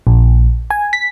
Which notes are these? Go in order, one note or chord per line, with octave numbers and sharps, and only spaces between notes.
A#1
G#5
B6